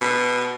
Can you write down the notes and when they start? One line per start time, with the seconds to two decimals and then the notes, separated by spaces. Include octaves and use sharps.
0.01 B2